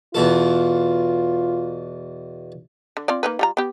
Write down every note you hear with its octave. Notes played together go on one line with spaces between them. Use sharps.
E2 B2 F4 A4
D3
C4 F4 D5
A#3 D#4 B4
G3 F4 A#5
B3 G4